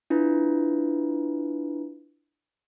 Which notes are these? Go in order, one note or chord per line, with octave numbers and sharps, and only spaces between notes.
D4 E4 F4 B4